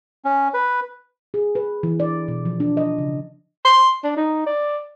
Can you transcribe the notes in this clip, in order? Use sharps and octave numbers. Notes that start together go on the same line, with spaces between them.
C#4
B4
G#4
B4
E3
D5
B2
F3
D4
D#5
C#3
C6
D4
D#4
D5